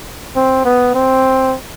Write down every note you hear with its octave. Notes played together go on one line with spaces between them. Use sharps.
C4
B3
C4